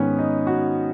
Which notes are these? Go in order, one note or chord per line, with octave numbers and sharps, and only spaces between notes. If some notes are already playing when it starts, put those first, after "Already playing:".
Already playing: G#2 D#3 B3 C#4
D#4
F#4